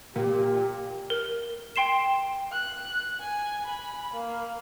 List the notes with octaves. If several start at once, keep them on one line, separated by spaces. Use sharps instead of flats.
A#2 G4
A#4
G5 C6 C7 E7
F#6
G#5
B5
A#3